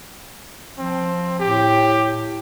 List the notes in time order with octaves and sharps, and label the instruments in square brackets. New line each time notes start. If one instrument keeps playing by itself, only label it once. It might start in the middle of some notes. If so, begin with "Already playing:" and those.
[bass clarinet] F3 [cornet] C4
[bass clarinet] A2 [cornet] G4